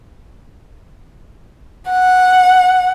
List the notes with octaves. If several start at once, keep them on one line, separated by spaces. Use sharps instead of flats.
F#5